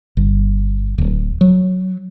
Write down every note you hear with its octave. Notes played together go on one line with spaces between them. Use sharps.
G1
D1
F#3